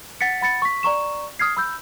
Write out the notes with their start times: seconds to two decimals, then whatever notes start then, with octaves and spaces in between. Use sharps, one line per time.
0.21 F#5 A6 B6 C#7
0.41 F#5 B5 A6 C#7
0.62 C#6 B6
0.83 D5 A#5 C#6 E7
1.39 D#6 F6 G#6 C7
1.57 B5 E6 G6